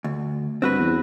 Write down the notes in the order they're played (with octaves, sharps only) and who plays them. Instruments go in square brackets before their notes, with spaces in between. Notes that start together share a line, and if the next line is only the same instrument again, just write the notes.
[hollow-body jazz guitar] D2
[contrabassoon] G2 [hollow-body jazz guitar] C4 F#4 B4
[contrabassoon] E2